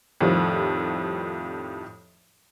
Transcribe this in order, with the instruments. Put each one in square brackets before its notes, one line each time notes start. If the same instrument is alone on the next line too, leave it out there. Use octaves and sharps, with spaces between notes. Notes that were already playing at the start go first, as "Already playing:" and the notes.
[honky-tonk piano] F2 A2 D#3 F3 G3